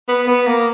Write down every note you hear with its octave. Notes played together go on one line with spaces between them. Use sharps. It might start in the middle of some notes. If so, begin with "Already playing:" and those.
B3
B3
A#3